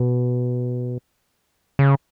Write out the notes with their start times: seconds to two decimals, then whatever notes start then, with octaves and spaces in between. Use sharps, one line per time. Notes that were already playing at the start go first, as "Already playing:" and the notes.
Already playing: B2
1.79 C#3